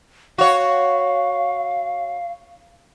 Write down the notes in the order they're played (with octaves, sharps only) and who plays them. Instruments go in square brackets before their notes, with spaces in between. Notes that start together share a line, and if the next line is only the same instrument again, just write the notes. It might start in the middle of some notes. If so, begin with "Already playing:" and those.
[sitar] F#4 C#5 [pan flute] F5